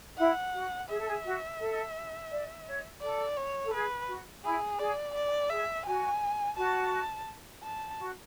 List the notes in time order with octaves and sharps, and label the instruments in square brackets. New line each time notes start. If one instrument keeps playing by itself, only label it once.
[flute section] E4 [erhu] F#5
[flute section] F#4
[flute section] G#4 [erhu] E5
[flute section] A4
G#4
F#4
A4
D5
C#5
[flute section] A4 [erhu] D5
[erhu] C#5
[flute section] A4
[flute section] G#4 [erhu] B4
[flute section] F#4
[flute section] E4 [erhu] G#4
[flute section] G#4 [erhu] D5
[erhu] D5
[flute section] G#4 [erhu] E5
[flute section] F#4 [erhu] G#5
[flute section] F#4 [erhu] A5
[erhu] A5
[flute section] F#4